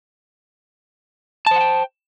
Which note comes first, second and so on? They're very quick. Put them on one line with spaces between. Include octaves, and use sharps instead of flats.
A5 C5 F#5 G5